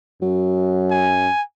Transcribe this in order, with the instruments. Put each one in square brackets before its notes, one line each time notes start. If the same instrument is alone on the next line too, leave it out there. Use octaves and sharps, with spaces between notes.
[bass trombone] F#2 [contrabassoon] F#3
[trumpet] G#5